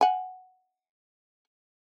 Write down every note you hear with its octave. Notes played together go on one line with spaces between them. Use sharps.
F#5 G#5